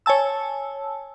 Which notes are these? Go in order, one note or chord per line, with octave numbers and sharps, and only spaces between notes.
C#5 G#5 A5 E6